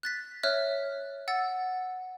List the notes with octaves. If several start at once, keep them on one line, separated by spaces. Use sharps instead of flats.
F#6 A6 B6
C#5 E5 F6 F#6
F#5 E6 A6